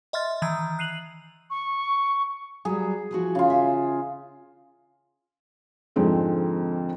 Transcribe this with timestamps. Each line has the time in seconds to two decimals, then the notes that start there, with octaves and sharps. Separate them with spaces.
0.13 D#5 E5 C6 F6 A6
0.42 D#3 E3 A#5 G6 G#6
0.79 F#6 C7 D#7 F7 F#7
1.50 C#6
2.65 F#3 G3 G#4
3.11 E3 F3 F#4
3.35 C#3 F4
3.50 E5
5.96 F2 G#2 D3 G#3 C4 A4